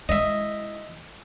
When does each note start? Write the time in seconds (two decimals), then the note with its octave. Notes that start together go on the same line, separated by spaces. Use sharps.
0.09 G#3 E4 D#5 E5